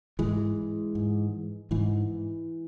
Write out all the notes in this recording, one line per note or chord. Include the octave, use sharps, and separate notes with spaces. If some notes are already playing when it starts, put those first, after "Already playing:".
G#2 E3 G#3
G#2
G#2 E3